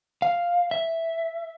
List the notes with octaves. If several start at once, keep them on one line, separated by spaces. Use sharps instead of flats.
F5
E5